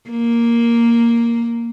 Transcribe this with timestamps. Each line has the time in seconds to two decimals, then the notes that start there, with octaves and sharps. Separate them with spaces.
0.10 A#3